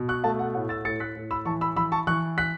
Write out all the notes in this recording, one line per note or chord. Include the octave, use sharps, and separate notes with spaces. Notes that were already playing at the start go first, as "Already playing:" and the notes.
Already playing: B2
C#6 F#6
A3 E5 A5
F#5
A2 F#5
E6 A6
A2 A6 C#7
F#6 B6
A2
B5 E6
E3 A5 C#6
B5 E6
E3 B5 E6
A5 C#6
E3 C#6 F#6
F#6 B6